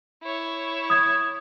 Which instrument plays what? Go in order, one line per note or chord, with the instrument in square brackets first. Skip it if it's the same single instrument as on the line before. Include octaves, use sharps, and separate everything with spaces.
[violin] E4 C#5
[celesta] D#6 G#6